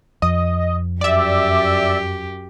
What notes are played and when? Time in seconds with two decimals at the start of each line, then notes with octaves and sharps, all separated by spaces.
0.22 F2 D#5
1.01 F#2 G4 D5 E5